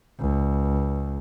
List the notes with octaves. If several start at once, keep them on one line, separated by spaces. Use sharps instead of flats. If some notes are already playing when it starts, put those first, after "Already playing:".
C#2